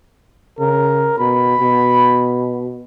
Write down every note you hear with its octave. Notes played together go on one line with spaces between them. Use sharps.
C#3 A#4
B2 B5
B2